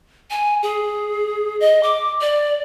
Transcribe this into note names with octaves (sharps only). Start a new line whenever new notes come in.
G#5
G#4
D#5
D6
D5